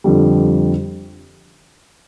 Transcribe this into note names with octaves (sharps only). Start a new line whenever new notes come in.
F2 D3 G3